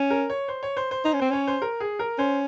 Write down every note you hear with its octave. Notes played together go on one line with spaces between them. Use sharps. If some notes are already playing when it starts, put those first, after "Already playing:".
Already playing: C#4
A#4
C#5
C5
C#5
C5
C5
D#4 C5
C#4
C4 C5
C#4 C#5
C5
A#4
G#4
A#4
C#4 C5